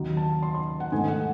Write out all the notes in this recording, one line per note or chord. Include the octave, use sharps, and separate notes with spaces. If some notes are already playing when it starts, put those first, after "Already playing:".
Already playing: D#2 D#3 F#3
A5
C6
C6
F#5
G#2 D#3 A3 G#5
F#5